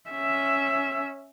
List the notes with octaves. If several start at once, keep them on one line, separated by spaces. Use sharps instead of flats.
C#4 E5